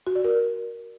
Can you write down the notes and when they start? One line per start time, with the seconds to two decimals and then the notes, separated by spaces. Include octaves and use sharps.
0.07 F#4
0.15 D5
0.24 A#4